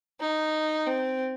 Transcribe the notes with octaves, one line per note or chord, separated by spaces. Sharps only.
D#4
C4